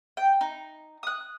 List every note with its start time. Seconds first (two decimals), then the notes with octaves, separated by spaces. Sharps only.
0.17 G5
0.41 D#4
1.03 D#6 F#6